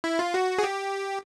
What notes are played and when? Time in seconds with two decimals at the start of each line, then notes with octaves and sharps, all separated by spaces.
0.04 E4
0.19 F4
0.34 F#4
0.58 G#4
0.64 G4